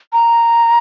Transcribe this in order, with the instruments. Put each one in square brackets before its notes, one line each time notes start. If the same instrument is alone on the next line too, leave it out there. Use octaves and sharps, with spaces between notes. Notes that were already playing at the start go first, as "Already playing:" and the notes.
[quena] A#5